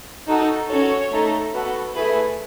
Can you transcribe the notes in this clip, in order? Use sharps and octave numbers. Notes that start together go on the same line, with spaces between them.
D#4 F#4 A4
C#4 F#4 A4 C#5
A3 D#4 A4
B3 F#4 A4
A3 E4 G#4 B4